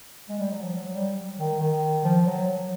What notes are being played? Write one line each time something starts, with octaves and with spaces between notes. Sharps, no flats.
G#3
G3
F#3
F3
F#3
G3
D#3
D#3
F3
F#3
F#3